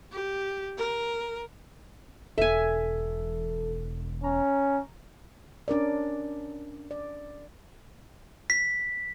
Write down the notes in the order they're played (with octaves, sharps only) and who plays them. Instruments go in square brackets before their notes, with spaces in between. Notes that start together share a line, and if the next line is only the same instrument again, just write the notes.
[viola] G4
A#4
[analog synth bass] E1 [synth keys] A4 [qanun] E5 G#5
[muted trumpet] C#4 [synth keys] A#5
[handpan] C#4 D4 A#4 D5
D5
[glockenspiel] B6